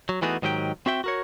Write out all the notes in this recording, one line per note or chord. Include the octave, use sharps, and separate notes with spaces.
F#3
E3 A3 B3 D#4 F#4 G#4
G#2 D#3 F#3 G4 G5
C4 F#4 E5 G5
F#4 A#4 C#5